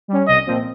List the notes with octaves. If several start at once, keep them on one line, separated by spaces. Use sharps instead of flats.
G3 C#4
C2 D#5
A#2 F3 C4